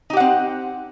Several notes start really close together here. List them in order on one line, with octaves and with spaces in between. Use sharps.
D#4 G4 F#5 C4